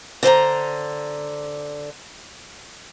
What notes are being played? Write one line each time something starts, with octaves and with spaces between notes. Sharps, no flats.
D3 C5 A5 A#5